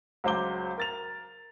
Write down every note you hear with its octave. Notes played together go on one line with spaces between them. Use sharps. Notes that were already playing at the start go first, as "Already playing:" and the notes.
C#2 F#3 C5 D6 G7
A#4 A6 F7